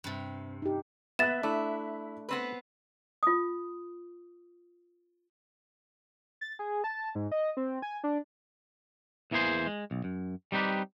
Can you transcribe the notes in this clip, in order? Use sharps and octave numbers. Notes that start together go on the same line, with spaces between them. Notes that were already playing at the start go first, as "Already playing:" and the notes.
G2 C3
D#4 G4
B3 E5 F#6 A6 E7
A3 D4 E4
B3 C4 B4
F4 D#6
A6
G#4
A5
G#2
D#5
C4
G#5
D4
E2 E3 A#3 G#4 C5
G#3
B1
F#2
G3 C4 D#4 G4 B4